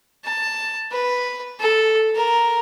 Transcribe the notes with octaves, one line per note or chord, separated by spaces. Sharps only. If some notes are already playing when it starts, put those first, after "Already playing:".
A5
B4
A4
A#4